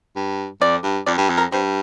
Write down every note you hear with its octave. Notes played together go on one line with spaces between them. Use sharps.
G2
F2 D5
G2
F2 D5
G2
F2
A#4
G2 C4